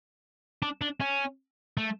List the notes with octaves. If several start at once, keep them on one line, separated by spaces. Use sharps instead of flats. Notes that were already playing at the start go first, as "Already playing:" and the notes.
D4
D4
C#4
A3